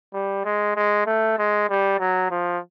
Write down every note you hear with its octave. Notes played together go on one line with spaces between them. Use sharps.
G3
G#3
G#3
A3
G#3
G3
F#3
F3